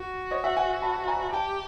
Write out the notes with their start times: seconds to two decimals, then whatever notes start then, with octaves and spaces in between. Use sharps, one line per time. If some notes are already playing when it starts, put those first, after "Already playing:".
Already playing: F#4
0.31 C#5 D#5
0.44 E5 F#5
0.57 F#5 G#5
0.82 A5 B5
1.08 G#5 A#5
1.33 G4 G5 A5